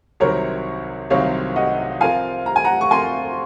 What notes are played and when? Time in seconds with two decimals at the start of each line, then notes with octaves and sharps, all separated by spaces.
0.20 C2 C3 D#3 F#3 C4 A#4 C#5
1.10 C2 C3 D#3 F#3 C4 C#5 F5
1.56 D#5 F#5
2.00 F3 C4 F4 A#4 F5 G#5
2.46 A#5
2.56 G#5
2.64 F#5 A#5
2.81 C#6
2.91 F3 C4 F4 A#4 G#5 C6